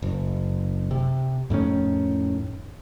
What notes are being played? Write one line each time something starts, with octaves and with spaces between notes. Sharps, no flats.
F#1
C3
F2 A2 D#3 C#4